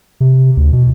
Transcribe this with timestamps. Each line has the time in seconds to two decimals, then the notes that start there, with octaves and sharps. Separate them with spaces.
0.20 C3
0.57 D2
0.73 B2